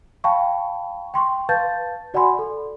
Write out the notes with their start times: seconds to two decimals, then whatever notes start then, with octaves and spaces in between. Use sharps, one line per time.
0.24 F5 G5 A5 B5 C#6
1.14 G5 C6 C#6
1.49 B4 F5 A5 G6 A6
2.14 F#4 D5 F#5 G#5 B5 C6
2.39 A4